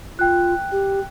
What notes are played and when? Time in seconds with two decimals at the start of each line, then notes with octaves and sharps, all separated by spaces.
0.19 F4 G5 F#6
0.72 G4